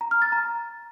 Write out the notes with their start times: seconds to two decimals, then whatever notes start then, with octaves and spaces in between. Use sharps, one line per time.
0.01 A#5
0.11 F6
0.22 A6
0.32 A#5